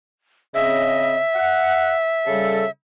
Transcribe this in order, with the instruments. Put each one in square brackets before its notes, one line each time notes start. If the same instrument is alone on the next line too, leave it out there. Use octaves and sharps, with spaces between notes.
[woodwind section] C#3 C4 D#5 [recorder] E5
[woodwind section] F#5
C#3 G3 A4